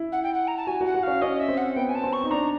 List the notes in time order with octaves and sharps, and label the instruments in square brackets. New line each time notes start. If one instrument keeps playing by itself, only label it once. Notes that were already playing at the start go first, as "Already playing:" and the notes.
Already playing: [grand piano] E4
[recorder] F#5
G5
F#5
A#5
A5
[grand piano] F#4 [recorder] G#5
[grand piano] F#4 [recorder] F#5
[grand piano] F#4
[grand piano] C#4 [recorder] F5
[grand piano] C#4 [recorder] D#5
[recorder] E5
[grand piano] C4
[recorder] F#5
[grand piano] B3 [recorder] G5
[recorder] G#5
A5
[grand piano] C4
[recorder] C#6
[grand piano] D#4
[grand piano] D4 [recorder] A#5